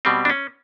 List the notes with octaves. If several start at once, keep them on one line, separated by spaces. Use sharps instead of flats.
B2 G3 C4
D4
C#4